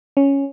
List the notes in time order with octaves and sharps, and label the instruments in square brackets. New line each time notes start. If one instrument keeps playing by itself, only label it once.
[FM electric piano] C#4